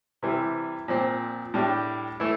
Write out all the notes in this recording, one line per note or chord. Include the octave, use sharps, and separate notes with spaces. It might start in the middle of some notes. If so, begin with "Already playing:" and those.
C3 E3 G3
A#2 F3 C4
A2 G3 D4 G4
E3 A3 E4